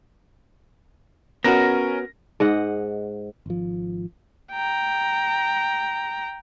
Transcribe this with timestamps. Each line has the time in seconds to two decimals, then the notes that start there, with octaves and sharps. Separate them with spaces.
1.44 B3 C#4 F#4 A#4 A#6
2.40 G#2 D#5 F#5
3.46 G#1 F3
4.53 G5 A#5